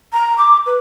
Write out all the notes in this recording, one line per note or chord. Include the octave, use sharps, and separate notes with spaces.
A#5
D6
B4